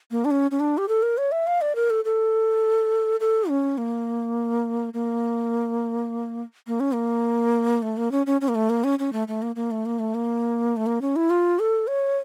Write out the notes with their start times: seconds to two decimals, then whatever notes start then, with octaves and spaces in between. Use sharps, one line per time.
0.11 A#3
0.25 D4
0.31 C#4
0.51 C#4
0.60 D4
0.78 G4
0.88 A4
1.03 A#4
1.18 C#5
1.32 E5
1.47 F5
1.61 D5
1.75 A#4
1.90 A4
2.05 A4
3.20 A4
3.49 C#4
3.78 A#3
4.94 A#3
6.67 A#3
6.80 C#4
6.92 A#3
7.82 A3
7.97 A#3
8.12 C#4
8.26 C#4
8.41 C#4
8.48 A#3
8.55 A3
8.70 A#3
8.84 C#4
8.99 C#4
9.13 A3
9.28 A3
9.42 A#3
9.56 A#3
9.71 A3
9.86 A#3
9.99 A3
10.15 A#3
10.77 A3
10.86 A#3
11.02 C#4
11.16 E4
11.30 F4
11.59 A4
11.87 C#5